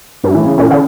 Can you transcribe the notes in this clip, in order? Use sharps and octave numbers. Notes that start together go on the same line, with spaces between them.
G2
A2 E3
C#3
A#2 C#4
D3